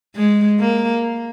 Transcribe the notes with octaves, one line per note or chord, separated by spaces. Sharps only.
G#3
A#3